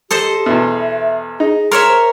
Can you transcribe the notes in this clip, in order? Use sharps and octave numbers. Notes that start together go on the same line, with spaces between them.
G4 A4 C5 D#5
E2 B2 E5
D#4 G#4
A#4 C#5 E5 C6
C5